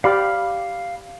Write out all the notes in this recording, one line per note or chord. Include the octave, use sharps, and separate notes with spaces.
G4 D5 F5 B5 F6